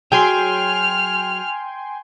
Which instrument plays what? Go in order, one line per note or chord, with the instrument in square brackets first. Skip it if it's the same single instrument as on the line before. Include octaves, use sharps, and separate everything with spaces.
[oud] F#3 G#4 [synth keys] G5 G#5 C6 [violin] F6